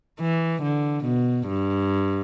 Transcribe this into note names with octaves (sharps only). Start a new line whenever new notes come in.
E3
D3
B2
G2